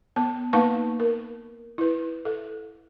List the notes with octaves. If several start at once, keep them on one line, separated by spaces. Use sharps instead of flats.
B3 A5
A#3 D#4 B4 F5 A5 C#6
A#4
E4 B4
A4